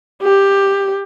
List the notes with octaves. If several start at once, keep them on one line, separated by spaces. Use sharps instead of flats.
G4